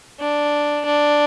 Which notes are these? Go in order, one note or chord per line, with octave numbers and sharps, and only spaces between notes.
D4
D4